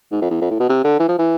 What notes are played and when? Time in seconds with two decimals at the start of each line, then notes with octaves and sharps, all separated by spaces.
0.12 G#2
0.22 F2
0.30 E2
0.41 F2
0.51 A2
0.60 B2
0.69 C3
0.84 D3
0.99 E3
1.09 F3
1.18 E3